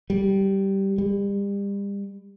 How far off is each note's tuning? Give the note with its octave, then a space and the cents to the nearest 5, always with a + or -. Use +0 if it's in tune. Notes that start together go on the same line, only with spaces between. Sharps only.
G3 -10
G3 +35